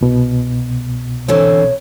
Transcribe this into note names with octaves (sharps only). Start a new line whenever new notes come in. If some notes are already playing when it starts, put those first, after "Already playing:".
C2 B2
D3 E3 C4 C#5